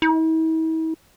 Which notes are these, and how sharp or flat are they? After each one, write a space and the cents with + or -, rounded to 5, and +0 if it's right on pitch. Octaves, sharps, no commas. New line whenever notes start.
E4 -45